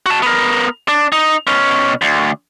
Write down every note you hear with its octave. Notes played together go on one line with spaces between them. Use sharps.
F#4 A5
B3 A#4
D4
D#4
B2 C#4
D2